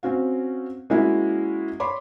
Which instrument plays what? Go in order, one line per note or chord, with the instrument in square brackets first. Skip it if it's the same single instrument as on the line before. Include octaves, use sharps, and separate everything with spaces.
[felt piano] C4 C#4 F#4 F5
G#3 A#3 C#4 E4 F#4
C#5 B5 C6 D6